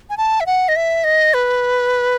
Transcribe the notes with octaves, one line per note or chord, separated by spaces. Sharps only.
G#5
A5
E5
F#5
D#5
E5
D#5
B4